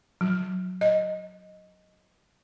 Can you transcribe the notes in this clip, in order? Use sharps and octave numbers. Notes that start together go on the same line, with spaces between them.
F#3
D#5